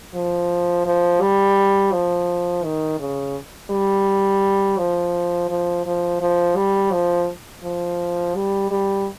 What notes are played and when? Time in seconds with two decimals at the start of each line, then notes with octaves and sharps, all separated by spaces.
0.14 F3
0.86 F3
1.21 G3
1.92 F3
2.64 D#3
2.99 C#3
3.70 G3
4.78 F3
5.49 F3
5.86 F3
6.21 F3
6.56 G3
6.92 F3
7.63 F3
8.35 G3
8.71 G3